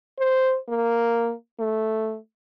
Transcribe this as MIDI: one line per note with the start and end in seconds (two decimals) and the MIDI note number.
0.19 0.57 72
0.69 1.33 58
1.59 2.17 57